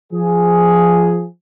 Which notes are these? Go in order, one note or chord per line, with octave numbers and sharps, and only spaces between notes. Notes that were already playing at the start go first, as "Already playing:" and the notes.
F3 G#4